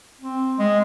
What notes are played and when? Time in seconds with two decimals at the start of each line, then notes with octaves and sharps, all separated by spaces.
0.21 C4
0.59 G#3